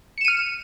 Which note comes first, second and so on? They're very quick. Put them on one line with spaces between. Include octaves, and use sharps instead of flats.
C#7 E7 D#7 F6